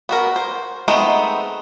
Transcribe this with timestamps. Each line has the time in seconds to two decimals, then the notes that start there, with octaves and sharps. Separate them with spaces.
0.09 B3 F#4 A#4
0.36 C5
0.88 G#3 A3 B3 C4 D#4